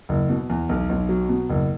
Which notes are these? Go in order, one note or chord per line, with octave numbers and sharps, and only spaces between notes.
F#1
B2
E2
B1
B1
F#3
B2
F#1